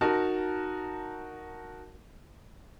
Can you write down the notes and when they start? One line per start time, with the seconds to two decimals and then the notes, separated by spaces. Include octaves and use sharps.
0.01 D#4 F#4 A#4 A5